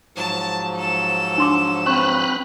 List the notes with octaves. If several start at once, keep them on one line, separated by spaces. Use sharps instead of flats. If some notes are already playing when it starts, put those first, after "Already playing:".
G#2 F3 F#3 A5
A4 E7
D4 C6 D6
C4 B4 C5 B5 C#6 F#6